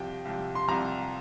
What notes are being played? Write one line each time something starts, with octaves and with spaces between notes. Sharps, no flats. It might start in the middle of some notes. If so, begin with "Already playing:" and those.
Already playing: C2 C3 F3 G5
C2 C3 F3
C6
C2 C3 F3 A#5